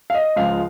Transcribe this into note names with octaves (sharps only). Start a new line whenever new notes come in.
F5
D#5
C#2 C#3 F3 G#3 F5